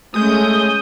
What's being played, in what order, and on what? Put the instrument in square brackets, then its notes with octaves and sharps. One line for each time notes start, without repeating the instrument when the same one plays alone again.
[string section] G#3 C#4 [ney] A3 [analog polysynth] D#6 G6